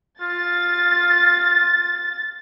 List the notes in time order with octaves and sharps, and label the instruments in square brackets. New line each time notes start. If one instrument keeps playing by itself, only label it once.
[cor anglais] F4 [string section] A6